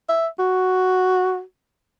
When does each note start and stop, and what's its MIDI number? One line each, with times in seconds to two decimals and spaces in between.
0.08 0.27 76
0.39 1.41 66